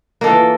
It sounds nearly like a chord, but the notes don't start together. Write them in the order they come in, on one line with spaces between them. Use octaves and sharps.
A#3 A4 F4 E3